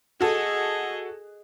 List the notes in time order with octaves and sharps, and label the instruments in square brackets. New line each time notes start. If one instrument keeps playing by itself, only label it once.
[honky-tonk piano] F#4 A4 [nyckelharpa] G#4 D#5